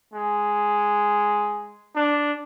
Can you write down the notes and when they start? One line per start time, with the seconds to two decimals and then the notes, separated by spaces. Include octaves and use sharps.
0.14 G#3
1.95 D4